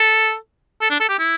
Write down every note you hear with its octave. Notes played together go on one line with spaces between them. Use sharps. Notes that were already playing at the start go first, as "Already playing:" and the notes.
Already playing: A4
A4
D4
A4
G4
E4